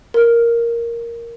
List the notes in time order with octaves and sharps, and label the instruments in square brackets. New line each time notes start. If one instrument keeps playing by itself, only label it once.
[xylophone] A#4